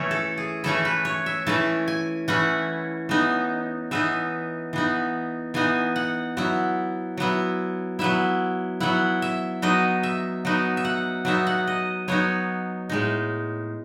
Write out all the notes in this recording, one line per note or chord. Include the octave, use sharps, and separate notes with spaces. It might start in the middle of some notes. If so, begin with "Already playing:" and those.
Already playing: E3 A3 C#4 E4 C#5
A4
G#4
E3 A3 C#4 E4 A4
B4
C#5
E5
E3 A3 C#4 E4 A5
G#5
E3 A3 C#4 E4 F#5
E3 B3 D#4
E3 B3 D#4 E5
E3 B3 D#4
E3 B3 D#4 G#5
F#5
F#3 B3 E4
F#3 B3 E4
F#3 B3 E4 E5
F#3 B3 E4 F#5
E5
F#3 B3 D#4 D#5
E5
F#3 B3 D#4
E5
F#5
F#3 B3 D#4 E5
F#5
D#5
F#3 B3 D#4 C#5
A2 G#3 D#4